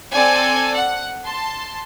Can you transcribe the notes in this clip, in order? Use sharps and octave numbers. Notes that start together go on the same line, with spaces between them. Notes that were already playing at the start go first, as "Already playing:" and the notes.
C4 A4 D5 G#5
F#5
A5 C6